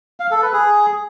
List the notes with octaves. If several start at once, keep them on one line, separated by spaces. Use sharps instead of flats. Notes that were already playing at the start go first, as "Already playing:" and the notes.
F5
A4
B4
G#4